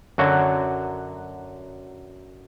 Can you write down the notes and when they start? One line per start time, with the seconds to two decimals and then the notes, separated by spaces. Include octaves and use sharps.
0.18 F#2 D3 F#3 F#4